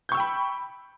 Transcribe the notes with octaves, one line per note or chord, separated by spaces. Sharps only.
G5 B5 C#6 E6 G6